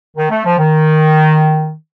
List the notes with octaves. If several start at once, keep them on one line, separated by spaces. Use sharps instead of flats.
D#3
A3
F3
D#3